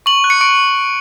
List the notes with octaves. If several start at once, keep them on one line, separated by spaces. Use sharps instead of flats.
C#6 F#7
F#6
C#7
C#6 D7